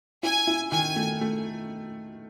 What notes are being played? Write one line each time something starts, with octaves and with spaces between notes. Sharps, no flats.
E4 G#5
E4
D#3 G#5
A3
A3